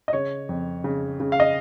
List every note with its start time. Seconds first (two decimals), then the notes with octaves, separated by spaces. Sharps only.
0.08 D#5
0.13 C#3 C#5
0.49 F2
0.84 C#3
1.20 C#3
1.32 F5
1.40 D#5